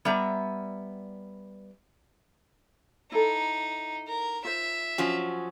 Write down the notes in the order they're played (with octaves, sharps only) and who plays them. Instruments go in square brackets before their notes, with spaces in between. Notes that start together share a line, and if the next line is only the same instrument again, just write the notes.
[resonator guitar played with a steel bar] G3 B3 E5 A#5
[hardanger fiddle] D#4 [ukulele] E4 A4
[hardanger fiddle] A#4
[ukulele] F4 C5 [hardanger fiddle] E5
[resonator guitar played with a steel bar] F3 F#3 C#4